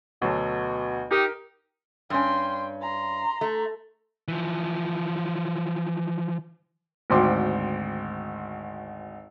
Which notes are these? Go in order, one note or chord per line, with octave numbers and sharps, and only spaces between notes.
D2 B2 F#3 A4
D#4 G4 A#4
G2 C#4 G5 C6
A#5 C6
A3
E3 F3
G#1 D2 G5 C6 D6